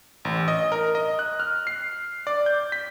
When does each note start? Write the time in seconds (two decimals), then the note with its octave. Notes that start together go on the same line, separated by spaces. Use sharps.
0.25 A1
0.48 D#5
0.72 A#4
0.95 D#5
1.19 F#6
1.40 F6
1.67 C7
2.27 D5
2.46 G6
2.72 B6